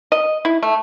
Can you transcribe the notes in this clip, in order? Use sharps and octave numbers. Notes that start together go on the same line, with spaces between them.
D#5
E4
A3